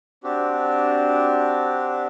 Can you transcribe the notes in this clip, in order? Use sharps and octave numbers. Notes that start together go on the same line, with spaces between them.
C4 D4 F#4 G4